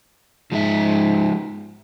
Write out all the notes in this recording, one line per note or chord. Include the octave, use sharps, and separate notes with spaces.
G#2 F3 G#3 E5